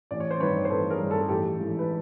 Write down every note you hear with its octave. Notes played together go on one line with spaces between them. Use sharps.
A1 D5
C#5
C5
G2 D#3 B4 C#5
C5
A1 A4 B4
G#4 A#4
G2 D#3
A4
G#4
A1 G4 A4
G#2 E3 A3
B4